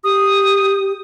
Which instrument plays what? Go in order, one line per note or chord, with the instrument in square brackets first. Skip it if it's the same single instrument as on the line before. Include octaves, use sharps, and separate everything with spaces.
[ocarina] G4 [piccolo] D#6